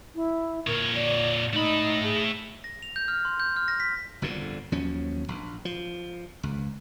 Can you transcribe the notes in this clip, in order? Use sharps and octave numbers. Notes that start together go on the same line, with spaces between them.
E4
A#2 A#4 C#5
D5
A3 D#4 B5
G#4
A#6
F7
G6
F6
C6
G6
F6
A#6
B6
G1 F2 A#2 D3
D#2 F3 F#3 C#4
A#1
F3
C#2